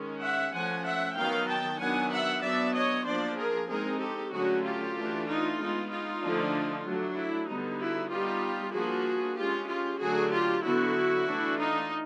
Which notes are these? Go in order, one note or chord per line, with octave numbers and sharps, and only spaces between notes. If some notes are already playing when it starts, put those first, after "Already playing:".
Already playing: D#3 G#3 C#4
E5 F#5
F3 A3 C#4 F#5 G#5
E5 F#5
D#3 F#3 B3 D#4 F5 G5
G5 A5
D#3 F#3 B3 D4 F#5 G#5
E5 F#5
F#3 B3 D4 D5 E5
C#5 D#5
F3 A#3 D4 C5 D5
G#4 A#4
G#3 C4 D#4 G#4 A#4
G4 A4
D3 F#3 A3 C#4 F#4 G#4
F4 G4
E3 A3 D4
D#4 F4
G#3 B3 D#4
D#4 F4
D3 F3 A3 D4
F#3 A3 D4
E4
D3 G3 B3 D#4
E4 F#4
G3 B3 D#4 F4 G4
F3 A#3 D4 F#4 G#4
G#3 C#4 F4 G4
F4 G4
D3 F#3 A3 D4 F#4 G#4
F4 G4
D3 F#3 B3 E4 F#4
E3 A3 D4
D#4 F4